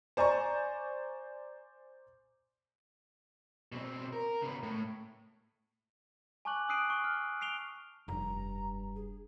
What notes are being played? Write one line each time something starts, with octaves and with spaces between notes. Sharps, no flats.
C5 D5 G#5 A#5 C#6
B2 C4
A#4
C#3 B3
A2
G#5 A5 C#6 D6 F#6 F#7
D#6 E6 F#6 C7 D7 D#7
C#6
F6
C7 D7 F7 G7
F1 G2 A#5
G#4